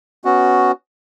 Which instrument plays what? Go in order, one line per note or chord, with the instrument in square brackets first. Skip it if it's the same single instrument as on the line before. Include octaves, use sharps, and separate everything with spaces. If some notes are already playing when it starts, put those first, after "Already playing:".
[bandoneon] B3 C#4 F#4